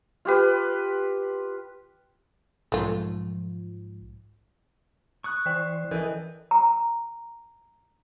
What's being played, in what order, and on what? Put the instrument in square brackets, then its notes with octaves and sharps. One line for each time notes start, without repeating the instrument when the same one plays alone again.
[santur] F4 G4 B4
[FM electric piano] B1 G#2 F3 [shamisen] A3 F4
[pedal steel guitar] C#6 D#6 F#6
[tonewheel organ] E3 C5 [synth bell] D5 G5
[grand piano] E3 [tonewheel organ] A4 D#5 [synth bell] A#4
[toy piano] A#5